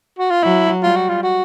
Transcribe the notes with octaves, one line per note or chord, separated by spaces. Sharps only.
F#4
F4
F#3 E4
G3 F4
F#4
F4
F#4